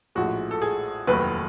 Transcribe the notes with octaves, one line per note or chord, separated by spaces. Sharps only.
A#1 A2 F3 G#3 F#4
A4
G#4
F1 D#2 D#3 F#3 B4